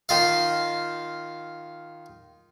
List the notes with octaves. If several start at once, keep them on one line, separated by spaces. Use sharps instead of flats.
D#3 F4 F5